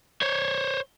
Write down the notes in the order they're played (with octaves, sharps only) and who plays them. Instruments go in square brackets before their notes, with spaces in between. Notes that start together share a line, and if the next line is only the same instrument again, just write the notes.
[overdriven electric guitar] C5 C#5